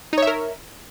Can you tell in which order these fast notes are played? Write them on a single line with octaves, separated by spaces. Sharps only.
D#4 C#5 E5 A#4